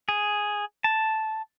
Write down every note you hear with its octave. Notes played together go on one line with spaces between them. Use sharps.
G#4
A5